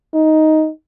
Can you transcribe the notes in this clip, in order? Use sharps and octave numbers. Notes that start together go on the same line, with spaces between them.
D#4